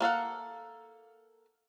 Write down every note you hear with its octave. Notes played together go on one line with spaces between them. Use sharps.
A#3 A4 F5 F#5